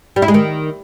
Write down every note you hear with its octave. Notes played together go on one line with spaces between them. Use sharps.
G3
E4
G#3
D#3